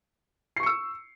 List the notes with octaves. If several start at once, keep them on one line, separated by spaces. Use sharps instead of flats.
C#6 E6 C7 C#7